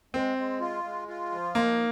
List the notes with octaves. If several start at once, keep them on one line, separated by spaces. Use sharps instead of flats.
G#3 C4
G#3
F4
G#3
F4
F3
A#3 D#4